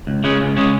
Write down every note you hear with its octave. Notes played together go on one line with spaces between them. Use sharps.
C#2
C#3 G#3 C#4
C#2
C#3 G#3 C#4